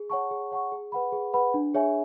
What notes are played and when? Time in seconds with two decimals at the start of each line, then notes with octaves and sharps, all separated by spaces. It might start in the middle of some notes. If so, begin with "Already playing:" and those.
Already playing: G#4
0.10 C#5 F#5 A5 C#6
0.31 G#4
0.51 C#5 F#5 A5 C#6
0.72 G#4
0.92 B4 F#5 B5
1.12 G#4
1.33 B4 F#5 B5
1.54 D4
1.74 G#4 C#5 E5 G#5